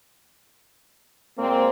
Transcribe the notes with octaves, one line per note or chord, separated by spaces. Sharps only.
A#2 G#3 A#3 C4